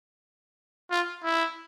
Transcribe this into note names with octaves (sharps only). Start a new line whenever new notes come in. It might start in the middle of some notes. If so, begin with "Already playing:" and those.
F4
E4